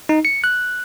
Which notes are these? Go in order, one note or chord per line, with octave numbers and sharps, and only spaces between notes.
D#4
C#7
F#6